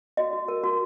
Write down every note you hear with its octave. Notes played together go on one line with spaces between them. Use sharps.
F#4 D#5
F#4
A#4
F#4